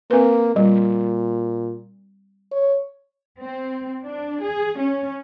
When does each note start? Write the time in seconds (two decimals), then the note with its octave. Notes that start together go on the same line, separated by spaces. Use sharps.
0.11 A#3 C4 B4
0.56 A#2 G3
2.52 C#5
3.40 C4
4.03 D4
4.43 G#4
4.80 C#4